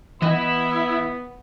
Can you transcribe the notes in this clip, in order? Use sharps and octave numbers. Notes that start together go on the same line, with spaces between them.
E3 B3 E4 D#5 B5